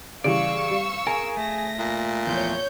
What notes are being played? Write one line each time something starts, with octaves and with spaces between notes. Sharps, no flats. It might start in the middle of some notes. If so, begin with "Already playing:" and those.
C#3 E3 G3 D5 F5 C#6 E6
G3
G#4 A#4 G#5
A3 A#6
A#2
E2 F3 A3 C#5 G6